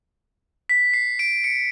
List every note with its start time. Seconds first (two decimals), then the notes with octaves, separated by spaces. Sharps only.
0.69 B6
0.94 C7
1.19 D7
1.44 C#7